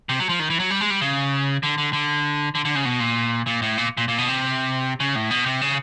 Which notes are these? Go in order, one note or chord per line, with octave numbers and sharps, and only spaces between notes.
C3
F#3
F3
D#3
E3
F#3
G3
G#3
G3
C#3
D3
D3
D3
D3
D3
C#3
B2
A#2
A#2
A2
A#2
A#2
A#2
B2
C3
C#3
A2
B2
C3
C#3